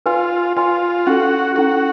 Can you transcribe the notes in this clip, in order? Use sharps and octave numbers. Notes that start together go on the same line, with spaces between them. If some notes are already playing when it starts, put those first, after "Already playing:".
F4 B4 D5 F5 G#5 C6
F4 B4 D5 F5 G#5 C6
C#4 E4 F#4 A4
C#4 E4 F#4 A4